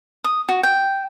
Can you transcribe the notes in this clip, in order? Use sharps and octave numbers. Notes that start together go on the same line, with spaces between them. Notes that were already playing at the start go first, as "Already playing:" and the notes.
D#6
F#4
G5